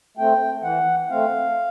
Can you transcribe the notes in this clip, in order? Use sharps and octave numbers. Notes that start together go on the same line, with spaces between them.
A3 C4 G5
E3 F#5
A3 C4 F5